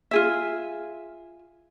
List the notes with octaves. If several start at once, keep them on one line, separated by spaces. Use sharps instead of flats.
F4 G#4 E5